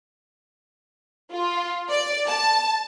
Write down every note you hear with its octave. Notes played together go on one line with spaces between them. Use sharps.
F4
D5
A5